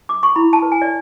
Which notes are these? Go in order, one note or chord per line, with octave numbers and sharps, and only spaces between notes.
D6
C#6
E4 B5
A5
B4
G#5
D5